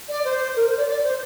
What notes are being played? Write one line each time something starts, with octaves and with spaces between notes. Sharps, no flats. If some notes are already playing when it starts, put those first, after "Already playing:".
D5
C5
A#4
C5
D5
D5
C5